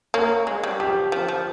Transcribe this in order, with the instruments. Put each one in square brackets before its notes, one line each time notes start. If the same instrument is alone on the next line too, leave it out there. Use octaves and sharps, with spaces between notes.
[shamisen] A#3 [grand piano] C#5
[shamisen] G#3
G3
[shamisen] F3 [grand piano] G4
[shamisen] F3
F3